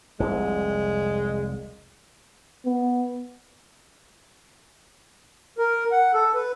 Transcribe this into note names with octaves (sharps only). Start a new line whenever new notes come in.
F1 C2 A#2 G#3
B3
A#4
F#5
A4
B4